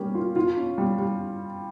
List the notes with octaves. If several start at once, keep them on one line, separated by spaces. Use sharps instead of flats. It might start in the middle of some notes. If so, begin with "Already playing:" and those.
Already playing: G3 A#3 C#4
F4
F4
C#4
G3
G3